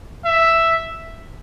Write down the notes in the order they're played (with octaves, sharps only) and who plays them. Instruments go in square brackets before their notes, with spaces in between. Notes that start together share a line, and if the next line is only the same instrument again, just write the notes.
[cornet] E5